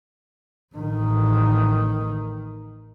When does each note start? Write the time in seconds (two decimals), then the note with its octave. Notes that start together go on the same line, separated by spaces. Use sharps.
0.76 A1 D#3